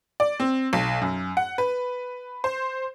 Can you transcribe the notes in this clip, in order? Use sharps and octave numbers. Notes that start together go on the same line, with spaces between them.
D5
C4
B1
F#2
F#5
B4
C5